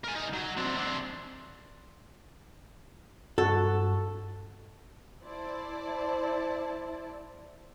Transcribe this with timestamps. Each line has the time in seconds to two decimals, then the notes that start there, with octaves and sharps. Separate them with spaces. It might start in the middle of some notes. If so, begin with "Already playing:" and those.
0.04 A#4 G#5
0.16 C2 D#4
0.33 F#3
0.57 C4 D4
0.77 C4 D4
3.38 G2 F#4 A4
5.22 E4 C5 D5 A5